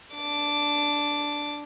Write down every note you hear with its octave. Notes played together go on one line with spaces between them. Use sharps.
D4 D6